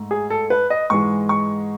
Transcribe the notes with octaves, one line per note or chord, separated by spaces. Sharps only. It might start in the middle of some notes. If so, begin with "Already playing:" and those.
Already playing: G#2 A3
G#4
A4
B4
D#5
G#2 E3 G#3 C#6
C#6